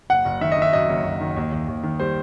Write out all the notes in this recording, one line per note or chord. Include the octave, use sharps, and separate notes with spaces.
F#1 F#5
F#1
D#3 E5
D#5
D#3 E5
F#2 D#5
F#1
F#1
D#3
D#2
D#2
D#2
D#3
G3 C5